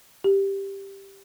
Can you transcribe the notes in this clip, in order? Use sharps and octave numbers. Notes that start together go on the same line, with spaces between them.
G4